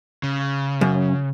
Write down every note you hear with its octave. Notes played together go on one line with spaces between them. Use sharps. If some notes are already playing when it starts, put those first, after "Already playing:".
C#3
F#2